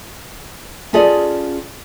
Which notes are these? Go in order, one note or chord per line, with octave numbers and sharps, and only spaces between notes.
C#4 F4 G#4 A4 D5 D#5